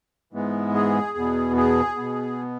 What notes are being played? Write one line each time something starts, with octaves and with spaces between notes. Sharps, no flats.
G#2 E3 G#3 B3
G#4
E2 B2 B3
G#4
B2 B3